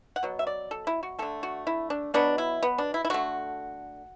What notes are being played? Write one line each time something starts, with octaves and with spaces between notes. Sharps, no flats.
F#5
B2 F#3
E5
D5
A4
E4
F#4
D3 A3 A4
F#4
E4
D4
B2 F#3 B3 D4
E4
B3
D4
E4
E4
D3 A3 F#4